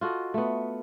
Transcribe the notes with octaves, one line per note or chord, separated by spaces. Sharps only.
F4 F#4 A4 D#5
A3 B3